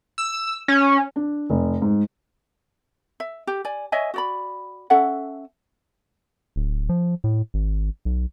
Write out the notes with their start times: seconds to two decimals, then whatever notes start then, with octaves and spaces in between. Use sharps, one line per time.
0.18 E6
0.68 C#4
1.16 D4
1.50 F1
1.82 G#2
3.20 E5
3.47 G4
3.65 D5 G#5
3.92 C#5 D#5 E5 G#5
4.14 F#4 D5 B5
4.90 C#4 A4 E5 F#5
6.56 D1
6.89 F3
7.24 A2
7.54 G#1
8.05 B1